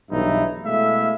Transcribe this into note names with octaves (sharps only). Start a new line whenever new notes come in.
B1 G2 E3 D#4 E4 E5
B2 G#3 A3 E4 E5 F5